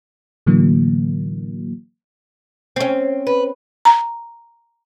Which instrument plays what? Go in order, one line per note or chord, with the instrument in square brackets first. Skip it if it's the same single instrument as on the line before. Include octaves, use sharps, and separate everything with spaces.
[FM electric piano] A2 D3 E3 F#3 A#3
[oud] C4 C#4
[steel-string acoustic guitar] B4
[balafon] A#5